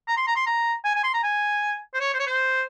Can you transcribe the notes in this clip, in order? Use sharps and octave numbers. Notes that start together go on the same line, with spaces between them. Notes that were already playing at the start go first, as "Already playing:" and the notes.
A#5
C6
A#5
C6
A#5
G#5
G#5
C6
A#5
G#5
C5
C#5
C5
C#5
C5